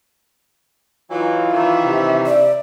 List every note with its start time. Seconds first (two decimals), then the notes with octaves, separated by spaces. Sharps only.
1.11 E3 F#3 D#4 F4
1.53 D#3 E3 D4 E5
1.84 C3
2.26 D5